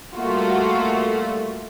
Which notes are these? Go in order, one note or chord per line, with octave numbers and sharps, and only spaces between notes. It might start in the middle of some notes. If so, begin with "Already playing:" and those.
G3 A3 A#3 F4 F#4